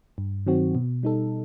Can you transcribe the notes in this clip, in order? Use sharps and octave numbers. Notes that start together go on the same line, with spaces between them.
G2
D#3 F#3 C4 F#4
B2
G3 D#4 A4